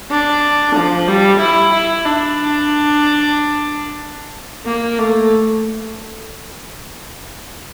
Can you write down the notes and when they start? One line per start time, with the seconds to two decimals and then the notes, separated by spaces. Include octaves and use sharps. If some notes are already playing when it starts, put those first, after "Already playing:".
0.10 D4
0.75 F3
1.07 G3
1.40 E4
1.73 E4
2.05 D4
4.66 A#3
4.98 A3